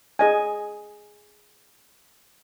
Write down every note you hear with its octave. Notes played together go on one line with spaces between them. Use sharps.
G#4 D#5 G#5